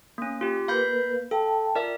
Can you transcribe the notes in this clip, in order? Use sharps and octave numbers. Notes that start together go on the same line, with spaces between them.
A#3 C#4
F4 G4
A#3 A#4 B4 F5 B5 G6
A4 F5 G5 A5
F4 A#4 D5 E5